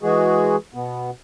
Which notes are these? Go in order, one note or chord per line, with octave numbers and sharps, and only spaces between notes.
E3 G#3 F#4 G#4
B2 B3